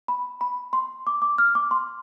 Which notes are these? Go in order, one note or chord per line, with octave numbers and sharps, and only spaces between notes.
B5
B5
C6
D6
D6
F6
D6
C6